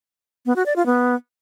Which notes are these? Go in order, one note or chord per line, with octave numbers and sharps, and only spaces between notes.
B3
F#4
D5
F4
B3